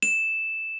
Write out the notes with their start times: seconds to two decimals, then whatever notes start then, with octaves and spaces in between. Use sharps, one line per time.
0.03 E7